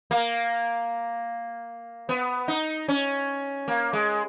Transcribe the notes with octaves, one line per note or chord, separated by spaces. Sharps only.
A#3
B3
D#4
C#4
A#3
G#3